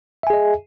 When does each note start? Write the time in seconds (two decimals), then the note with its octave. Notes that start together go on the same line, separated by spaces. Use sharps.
0.23 E5
0.27 G#5
0.30 G#4
0.33 D#5